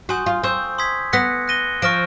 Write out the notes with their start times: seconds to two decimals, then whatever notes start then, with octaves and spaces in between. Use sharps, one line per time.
0.09 F#4 G#5 C6 D#6 G6
0.26 F4
0.43 C4 C#6 E6 G6
0.78 C6 D#6 G#6 B6
1.13 B3 D#6 F#6 A#6 C#7
1.48 F#6 A#6 D#7 G7
1.82 F3 C#6 F6 A#6 D7